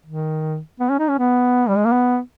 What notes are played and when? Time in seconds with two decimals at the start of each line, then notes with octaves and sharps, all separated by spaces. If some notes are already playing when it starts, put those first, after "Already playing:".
0.06 D#3
0.80 B3
0.90 C#4
0.99 D#4
1.09 C#4
1.18 B3
1.68 G3
1.77 G#3
1.85 A#3
1.92 B3